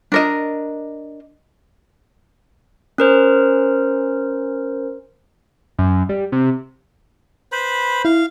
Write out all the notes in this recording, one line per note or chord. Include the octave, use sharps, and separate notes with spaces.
D4 A#4 D#5
C#4 A#4 C5
F#2
G3
C3
B4 C5 B5
E4 F5